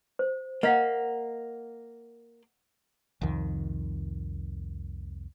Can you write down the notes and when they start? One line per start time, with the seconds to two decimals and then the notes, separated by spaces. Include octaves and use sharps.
0.19 C5
0.63 A#3 D#5 F5 F#5
3.21 C2 F2 D#3